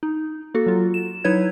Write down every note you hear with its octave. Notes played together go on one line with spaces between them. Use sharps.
D#4
A#3 F#4 A4
F#3 F4
E7
F#3 D#4 E4 B4 C#5 G#6